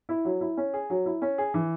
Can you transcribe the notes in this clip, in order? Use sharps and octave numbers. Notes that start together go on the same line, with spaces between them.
E4
F#3
E4
C#4
G#4
F#3
E4
C#4
G#4
E3